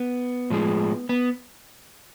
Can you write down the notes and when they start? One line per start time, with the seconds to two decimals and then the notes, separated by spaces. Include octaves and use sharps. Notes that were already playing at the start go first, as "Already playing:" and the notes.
Already playing: B3
0.50 A2 F3 G#3
1.09 B3